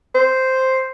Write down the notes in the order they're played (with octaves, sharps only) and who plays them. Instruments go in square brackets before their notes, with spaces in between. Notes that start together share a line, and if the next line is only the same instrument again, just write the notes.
[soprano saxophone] C5